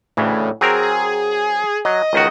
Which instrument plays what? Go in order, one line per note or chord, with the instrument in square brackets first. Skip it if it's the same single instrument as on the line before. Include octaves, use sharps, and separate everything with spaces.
[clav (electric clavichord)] D2 C#3 E3 [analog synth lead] A2
[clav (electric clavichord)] F#3 C4 A#4 [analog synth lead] G#4
[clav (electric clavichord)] F#3 [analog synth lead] D#5
[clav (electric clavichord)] C#2 D#3 F#4